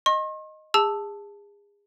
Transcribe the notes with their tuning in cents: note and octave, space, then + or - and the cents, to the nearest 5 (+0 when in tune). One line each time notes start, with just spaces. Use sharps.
D#5 -5 C6 +45
G#4 -30 A5 +0 E6 +0